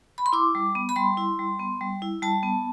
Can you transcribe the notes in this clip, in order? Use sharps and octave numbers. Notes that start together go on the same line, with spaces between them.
B5
C6
E4 D6
G3
B3
B5
G3 C6
E4
G3
B3
G3
E4
G3 A5
B3